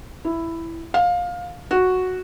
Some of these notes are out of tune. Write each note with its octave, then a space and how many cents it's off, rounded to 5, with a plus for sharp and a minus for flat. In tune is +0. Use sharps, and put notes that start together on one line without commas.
E4 +5
F5 +20
F#4 -5